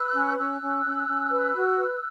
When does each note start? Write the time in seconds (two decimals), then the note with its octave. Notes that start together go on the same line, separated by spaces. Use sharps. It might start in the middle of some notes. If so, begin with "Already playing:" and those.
Already playing: B4 E6 F#6
0.13 C#4
0.37 C#4 E6 F#6
0.60 C#4
0.84 C#4
1.07 C#4
1.31 B4
1.54 F#4
1.78 B4